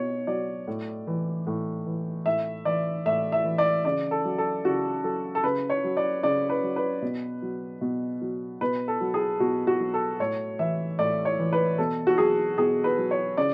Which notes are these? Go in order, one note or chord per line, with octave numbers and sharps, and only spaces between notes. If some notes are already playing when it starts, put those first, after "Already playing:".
Already playing: B2 C#5
F#3 D5
A2
E3
A2
E3
A2 E5
E3 D5
A2 E5
E5
E3
D5
C#3 D5
A4
F#3
A4
C#3 F#4
F#3 A4
A4
C#3 B4
C#5
F#3
D5
C#3 D5
B4
F#3
B4
B2
F#3
B2
F#3
B2 B4
A4
F#3
G#4
B2 F#4
F#4
F#3
A4
A2 C#5
E3 E5
A2 D5
C#5
E3
B4
B2 A4
F#4
F#3 G#4
B2 G#4
B4
F#3
C#5
C#3 D5